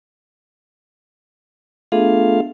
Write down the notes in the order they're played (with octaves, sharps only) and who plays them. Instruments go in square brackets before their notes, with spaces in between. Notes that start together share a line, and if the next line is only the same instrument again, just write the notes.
[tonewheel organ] A3 F4 F5 [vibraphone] B3 D4 G#4